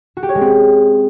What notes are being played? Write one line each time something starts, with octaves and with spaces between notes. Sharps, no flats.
F#4
G4
C#5
G#3
C4